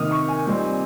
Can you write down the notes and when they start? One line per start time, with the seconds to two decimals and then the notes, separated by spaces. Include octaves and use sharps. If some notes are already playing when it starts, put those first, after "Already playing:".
Already playing: C3 D#3 A#3 D#4 D#6 F6
0.11 C#6
0.28 G#5
0.47 A#2 G3 C4 D#4